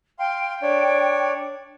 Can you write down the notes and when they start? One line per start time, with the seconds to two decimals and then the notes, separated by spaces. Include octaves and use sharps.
0.19 F5 G5 C6
0.62 D4 C#5 D5